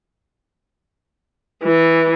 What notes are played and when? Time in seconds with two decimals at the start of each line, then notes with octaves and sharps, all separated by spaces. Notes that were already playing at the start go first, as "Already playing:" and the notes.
1.63 E3